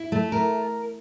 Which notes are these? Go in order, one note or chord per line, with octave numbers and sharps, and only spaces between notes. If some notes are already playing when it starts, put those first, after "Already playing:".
Already playing: E4
A3
A#4